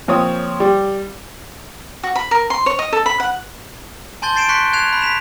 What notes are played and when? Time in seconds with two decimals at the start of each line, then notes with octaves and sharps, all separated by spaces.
0.08 A#2 F3 C4 C#5 D#6
0.60 G3
2.03 F#4
2.15 B5
2.31 A#4
2.50 C6
2.66 C#5
2.79 D#5
2.93 A4
3.06 B5
3.20 F#5
4.22 G#5 A5 C6 G6 A6 G7
4.36 G6 A6 C7 D7 E7
4.49 C6 C#6 F#6 B6 C#7
4.73 F#6 G#6 C7 E7 F7
4.88 B5 F#6
5.01 B5 B6 E7 F7